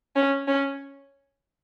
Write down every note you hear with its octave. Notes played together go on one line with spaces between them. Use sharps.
C#4
C#4